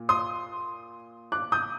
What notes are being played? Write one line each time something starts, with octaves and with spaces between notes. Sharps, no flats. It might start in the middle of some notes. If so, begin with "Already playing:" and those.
Already playing: A#2
C6 D#6
D6 F#6
D#6 G6